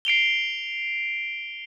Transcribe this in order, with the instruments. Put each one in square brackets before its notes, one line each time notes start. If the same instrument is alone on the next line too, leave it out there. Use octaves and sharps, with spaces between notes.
[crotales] C7 D7 F7 G7